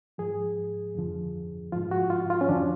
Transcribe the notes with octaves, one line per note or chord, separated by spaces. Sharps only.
G#2 F3 G#4
F2 D3 F3
G#2 F3 F4
F#4
F4
F4
C#4
F2 D3 F3 D4